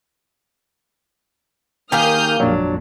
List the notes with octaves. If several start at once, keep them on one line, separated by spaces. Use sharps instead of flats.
D#3 A#3 G4 G#4 F5 D#6 F6 G6
G#1 F2 A#2 F#3 D4